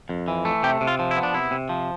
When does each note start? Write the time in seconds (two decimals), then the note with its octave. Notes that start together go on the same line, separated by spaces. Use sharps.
0.09 F2
0.28 E3
0.45 A3
0.63 C3 G4
0.81 C3
0.87 F4
0.99 F3
1.11 E4
1.17 B3
1.23 D4
1.34 C3 E4
1.51 C3
1.69 F3